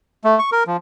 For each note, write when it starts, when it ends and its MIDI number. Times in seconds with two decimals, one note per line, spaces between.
0.24 0.39 57
0.39 0.50 85
0.52 0.64 70
0.67 0.77 53